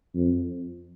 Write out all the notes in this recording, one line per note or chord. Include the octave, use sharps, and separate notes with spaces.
F2